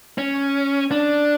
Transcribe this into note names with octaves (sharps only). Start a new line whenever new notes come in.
C#4
D4